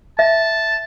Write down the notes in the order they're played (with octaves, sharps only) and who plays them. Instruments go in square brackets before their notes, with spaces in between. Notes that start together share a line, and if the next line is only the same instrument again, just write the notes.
[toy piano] E5 [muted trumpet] A5